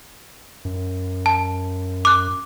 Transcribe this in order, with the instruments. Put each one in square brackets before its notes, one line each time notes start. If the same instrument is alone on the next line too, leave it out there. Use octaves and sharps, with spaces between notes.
[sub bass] F#2
[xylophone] A5
D6 F#6